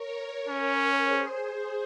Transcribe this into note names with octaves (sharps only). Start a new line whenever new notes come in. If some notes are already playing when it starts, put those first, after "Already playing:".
Already playing: A#4 C#5
C#4
G#4 C5